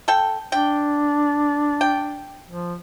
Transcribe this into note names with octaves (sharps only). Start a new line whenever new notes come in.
A4 G5
D4 G5
G5
F3